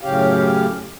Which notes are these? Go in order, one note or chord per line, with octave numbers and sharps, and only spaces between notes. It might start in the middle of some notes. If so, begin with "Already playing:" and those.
F#2 A2 C#3 C#4 G4 F5